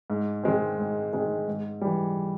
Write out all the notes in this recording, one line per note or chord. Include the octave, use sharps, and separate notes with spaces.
G#2
D#3 G#3 C4
G#2
D#3 G#3 C4
G#2
E3 G3